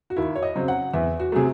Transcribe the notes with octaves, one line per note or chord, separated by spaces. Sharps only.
F#4
D#2 E4
C#5
D#5
C#3 F#3 C4
F#5
E2 E5
F#4
C3 F#3 A3 G#4